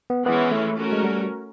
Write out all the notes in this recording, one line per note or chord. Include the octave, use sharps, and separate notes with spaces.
B3
E3 G#3 B3 C#4 E4
A3
A3 C#4 F#4 A#4
G#3
G3